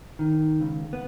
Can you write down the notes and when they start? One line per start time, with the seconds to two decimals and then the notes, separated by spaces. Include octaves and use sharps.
0.19 D#3
0.60 C#2
0.93 B3